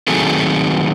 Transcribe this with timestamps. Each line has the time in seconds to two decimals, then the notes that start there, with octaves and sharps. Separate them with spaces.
0.08 D#3 F#3 A3 C4 G#4 A4